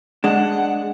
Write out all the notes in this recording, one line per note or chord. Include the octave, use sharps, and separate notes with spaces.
G#3 D4 F#5